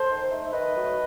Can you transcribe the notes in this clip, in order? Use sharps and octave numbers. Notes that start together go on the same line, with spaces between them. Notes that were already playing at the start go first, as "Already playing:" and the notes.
Already playing: A4 C5
D#3
A3 D#4
E5
D#3 B4 D#5
F#3 A3